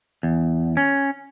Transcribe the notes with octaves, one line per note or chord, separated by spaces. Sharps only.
E2
C#4